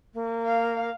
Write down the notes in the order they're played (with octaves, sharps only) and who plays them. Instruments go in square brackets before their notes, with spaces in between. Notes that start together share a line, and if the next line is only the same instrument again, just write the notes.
[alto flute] A#3
[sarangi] F5